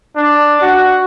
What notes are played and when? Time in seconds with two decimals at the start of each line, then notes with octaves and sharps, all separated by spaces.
0.16 D4
0.62 F#4